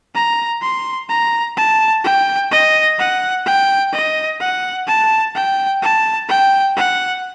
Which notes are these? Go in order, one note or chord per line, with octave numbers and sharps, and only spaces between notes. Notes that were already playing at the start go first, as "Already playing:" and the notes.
A#5
C6
A#5
A5
G5
D#5
F#5
G5
D#5
F#5
A5
G5
A5
G5
F#5